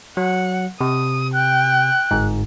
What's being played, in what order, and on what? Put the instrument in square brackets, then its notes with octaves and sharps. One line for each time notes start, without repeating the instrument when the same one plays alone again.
[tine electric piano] F#3 [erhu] F#5
[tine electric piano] C3 [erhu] D#6
[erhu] G5 [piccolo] F#6
[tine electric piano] G1 G#2